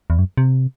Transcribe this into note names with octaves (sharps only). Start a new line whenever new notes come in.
E2
F#2
C3